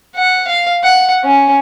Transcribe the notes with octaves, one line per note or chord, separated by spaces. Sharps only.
F#5
F5
F#5
C#4